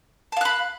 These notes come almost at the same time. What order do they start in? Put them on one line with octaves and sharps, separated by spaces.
A5 F5 F#6 B5